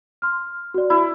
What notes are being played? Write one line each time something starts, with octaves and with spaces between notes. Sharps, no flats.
C6 F6
F#4 D5
E4